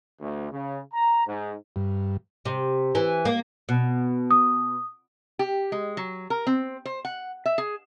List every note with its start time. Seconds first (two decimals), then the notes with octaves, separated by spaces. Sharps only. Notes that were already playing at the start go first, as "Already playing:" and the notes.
0.20 D2
0.52 C#3
0.93 A#5
1.26 G#2
1.76 G2
2.45 C3
2.95 E3
3.25 A#3
3.69 B2
4.31 D#6
5.39 G4
5.72 G#3
5.97 F#3
6.30 A#4
6.47 C4
6.85 C5
7.05 F#5
7.46 E5
7.58 G#4